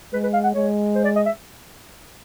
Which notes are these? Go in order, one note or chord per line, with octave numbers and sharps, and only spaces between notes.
G#3 B4
B4
F5
F#5
G#3 C#5
C5
D5
D#5
E5